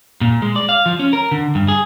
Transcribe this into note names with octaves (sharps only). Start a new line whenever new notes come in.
A#2
G#3
D5
F5
F3
C#4
A#4
D3
G2
G#4